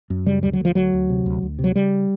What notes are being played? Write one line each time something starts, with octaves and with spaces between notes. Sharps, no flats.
F#2
C#3 G3
D2 G3
F#3
D2 F3
D2 F#3
D2
C3
D2
D2
C3
F#3
C#3 G3